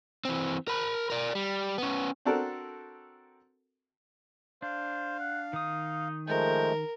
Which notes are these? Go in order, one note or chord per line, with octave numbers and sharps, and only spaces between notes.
E3 C4
A#4 B5
A#4 D5
G3
B3 C#4
C4 D4 F#4 A4 A#4
D4 C5 F5
F#5
D#3 D#4 D#6
F3 G#3 A3 A#4 G5